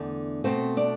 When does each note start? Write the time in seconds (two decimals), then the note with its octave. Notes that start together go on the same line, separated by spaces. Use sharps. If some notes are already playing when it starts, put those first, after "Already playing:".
Already playing: E2 D3 A3
0.44 B2 A3 C4 C5
0.77 D4 D5